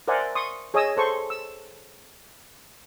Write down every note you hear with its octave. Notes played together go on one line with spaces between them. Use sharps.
A#4 C5 D5 E5 F#5 G#5
C6 C#6 D#6
G#4 C#5 D#5 G#5 D#6 E6
A4 C5 C#6
E6